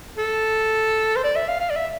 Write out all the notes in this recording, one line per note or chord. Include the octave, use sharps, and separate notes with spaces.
A4
C5
D5
E5
F5
F5
D5
E5